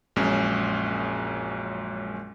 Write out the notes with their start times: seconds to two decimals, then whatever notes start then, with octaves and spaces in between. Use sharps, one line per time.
0.16 A#1 F#2 G#3 C#4